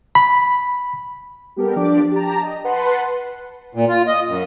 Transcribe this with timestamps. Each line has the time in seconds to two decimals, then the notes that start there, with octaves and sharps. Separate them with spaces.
0.15 B5
1.56 G3 B3 G4 A4 A#4
1.76 F3 D4 G4 D5 D6
2.12 G4 A5 A#5
2.43 D#5
2.64 B4 F#5 A5 C6
3.75 A#2
3.89 F4
4.07 D#5
4.28 F#2